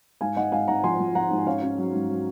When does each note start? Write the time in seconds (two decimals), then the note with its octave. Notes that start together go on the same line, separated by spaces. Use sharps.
0.21 G#2 F5 G#5
0.36 G#2 D#5 F#5
0.52 G#2 F5 G#5
0.68 G#2 F#5 A#5
0.84 F3 G#5 C6
0.99 F3
1.15 F3 F#5 A#5
1.31 G#2
1.46 C#4 C#5 F5
1.62 C#4
1.78 F#3
1.94 G#2
2.09 F#3